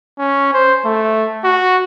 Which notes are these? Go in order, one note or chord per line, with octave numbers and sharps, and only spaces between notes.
C#4
C5
A3
F#4